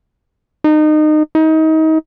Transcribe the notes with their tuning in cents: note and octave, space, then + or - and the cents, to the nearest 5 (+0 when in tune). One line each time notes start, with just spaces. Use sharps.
D#4 -25
D#4 +30